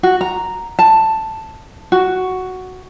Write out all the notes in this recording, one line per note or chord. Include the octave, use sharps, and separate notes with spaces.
F#4
A#5
A5
F#4